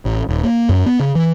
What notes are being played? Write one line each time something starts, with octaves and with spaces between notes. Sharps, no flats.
A1
D#1
A#3
F#2
B3
C#3
E3